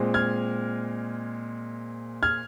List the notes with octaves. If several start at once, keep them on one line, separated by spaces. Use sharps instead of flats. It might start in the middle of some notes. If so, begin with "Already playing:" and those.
Already playing: A#2 G#3 C4
F6 G#6
F6 G#6